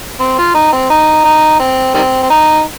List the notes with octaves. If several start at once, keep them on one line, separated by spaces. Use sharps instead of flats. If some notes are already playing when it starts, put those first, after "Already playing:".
C4
F4
D#4
C4
D#4
D#4
C4
D#3 G3 C4
C4
D#4